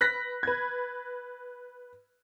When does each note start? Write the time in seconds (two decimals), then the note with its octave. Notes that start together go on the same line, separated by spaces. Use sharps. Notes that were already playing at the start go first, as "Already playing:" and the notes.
0.01 B4 F#6 A#6 B6
0.43 B4 G#6